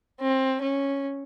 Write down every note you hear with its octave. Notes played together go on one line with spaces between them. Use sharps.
C4
C#4